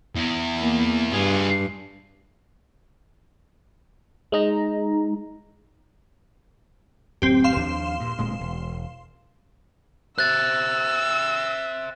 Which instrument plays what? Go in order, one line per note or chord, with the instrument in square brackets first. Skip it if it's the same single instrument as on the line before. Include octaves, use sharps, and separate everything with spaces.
[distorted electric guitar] E2
[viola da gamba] A#3
[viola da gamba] G2 [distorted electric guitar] F4 G#4
[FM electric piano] G#3 D#4 A#5
[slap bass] D1 F#2 [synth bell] C4 G4
[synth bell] F5 C6 E7
[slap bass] D#2 F3 D4
G2 A#2
D1 A#2 G#3
E1
[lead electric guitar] C5 E5 [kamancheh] E6 [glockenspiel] F#6 A6